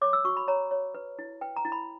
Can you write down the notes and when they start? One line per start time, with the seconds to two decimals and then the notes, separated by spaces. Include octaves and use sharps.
0.01 C#5 D6
0.13 E6
0.25 F#4 C#6
0.37 B5
0.48 C#5 A#5
0.71 C#5
0.95 B4
1.19 E4
1.41 B4 G5
1.56 A#5
1.65 E4
1.72 B5